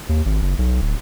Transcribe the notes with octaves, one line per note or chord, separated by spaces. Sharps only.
D#2
G#1
F#1
B1
D1